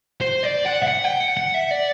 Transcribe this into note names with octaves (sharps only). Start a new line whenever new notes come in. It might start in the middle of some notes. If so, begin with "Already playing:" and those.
C5
D5
F#5
E5
F#5
G5
F#5
F#5
E5
D5